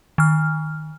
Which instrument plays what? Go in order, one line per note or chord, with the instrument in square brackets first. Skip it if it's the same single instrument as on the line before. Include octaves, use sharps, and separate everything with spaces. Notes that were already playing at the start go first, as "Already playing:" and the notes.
[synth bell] D#3 F6